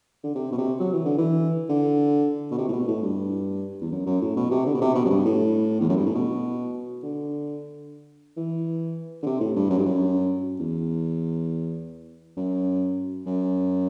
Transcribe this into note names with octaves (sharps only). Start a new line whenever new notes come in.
D3
C3
B2
C3
F#3
E3
D3
E3
D3
B2
C3
A2
B2
A2
G2
E2
F#2
F#2
A2
B2
C3
D3
B2
C3
B2
F#2
G2
A2
E2
F#2
G2
A2
B2
D3
E3
D3
C3
A2
G2
F#2
G2
F#2
E2
F#2
F#2